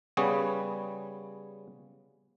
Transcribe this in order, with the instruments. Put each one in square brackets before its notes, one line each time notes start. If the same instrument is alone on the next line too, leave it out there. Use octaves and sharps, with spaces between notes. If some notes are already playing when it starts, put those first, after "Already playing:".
[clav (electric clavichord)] C#3 G3 B3 G#4 C#5